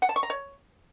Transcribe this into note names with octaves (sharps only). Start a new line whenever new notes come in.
F#5
A5
C#6
A#5
C#5